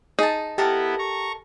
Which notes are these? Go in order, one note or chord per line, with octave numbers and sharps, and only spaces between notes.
D#4 G#4 A5
B3 E4 G4 A4 A#4 A5
A#5 C#6